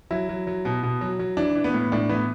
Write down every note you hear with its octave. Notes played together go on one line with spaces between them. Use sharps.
F#3 E4
F#3
F#3
B2
B2
F#3
F#3
E3 D4
E3
B3
A2
A2 D4
E3 B3